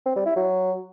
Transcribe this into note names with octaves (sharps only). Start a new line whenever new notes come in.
C4
G3
E4
F#3